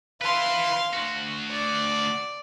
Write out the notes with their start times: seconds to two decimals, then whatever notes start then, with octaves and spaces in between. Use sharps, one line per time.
0.21 E4 B4 F5 C6
0.93 D2 F#4
1.51 D5